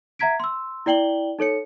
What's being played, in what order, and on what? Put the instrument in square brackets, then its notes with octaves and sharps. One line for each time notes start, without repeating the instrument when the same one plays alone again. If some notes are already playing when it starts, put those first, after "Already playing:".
[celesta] E5 F#5 A#5 G#6 B6 D7
C6 E6
E4 D5 G5 F#7 G7
D#4 A4 C#5 C#7